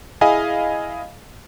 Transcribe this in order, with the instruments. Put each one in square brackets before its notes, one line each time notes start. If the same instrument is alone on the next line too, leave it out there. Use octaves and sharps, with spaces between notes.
[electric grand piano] E4 G#4 D#5 F5 G#5 B5